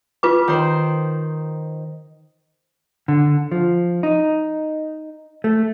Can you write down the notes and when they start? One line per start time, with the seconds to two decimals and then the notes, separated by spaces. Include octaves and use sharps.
0.23 F4 B4 D6
0.48 D#3 C5
3.08 D3
3.52 F3
4.03 D#4
5.44 A3